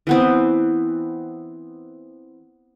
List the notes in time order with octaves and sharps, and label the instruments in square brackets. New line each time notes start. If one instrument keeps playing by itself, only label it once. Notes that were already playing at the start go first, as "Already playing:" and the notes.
[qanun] E3 B3 C4